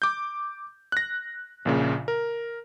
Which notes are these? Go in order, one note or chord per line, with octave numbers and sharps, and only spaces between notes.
D6 G6
F#6 A#6
A#1 A#2 C#3
A#4